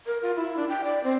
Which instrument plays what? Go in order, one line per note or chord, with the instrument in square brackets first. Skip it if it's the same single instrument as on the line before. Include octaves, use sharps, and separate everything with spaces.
[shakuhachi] A#4
F4
E4
D4
G5
D5
C4